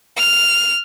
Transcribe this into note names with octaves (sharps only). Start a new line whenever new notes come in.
F6